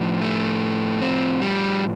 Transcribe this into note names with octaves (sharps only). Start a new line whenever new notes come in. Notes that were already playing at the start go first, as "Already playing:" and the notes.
Already playing: A2 F3
A3
C4
G3